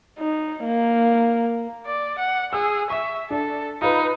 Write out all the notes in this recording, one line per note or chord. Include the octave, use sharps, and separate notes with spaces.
D#4
A#3
D5
F#5
G#4 E6
E5 C#6
D4 A4
D#4 F4 B4